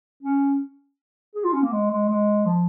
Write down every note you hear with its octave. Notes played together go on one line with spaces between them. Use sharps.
C#4
G#4
F4
C#4
A#3
G#3
G#3
G#3
F3